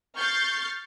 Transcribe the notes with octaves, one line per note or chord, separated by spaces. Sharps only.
C#6 F6 G6 A6 C7